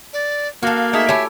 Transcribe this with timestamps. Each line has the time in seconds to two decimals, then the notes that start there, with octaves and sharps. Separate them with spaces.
0.13 D5
0.63 A#3 F#4 A4 F5
0.93 A3 D#4 G#4 E5
1.09 A3 E4 G4 C#5 G#5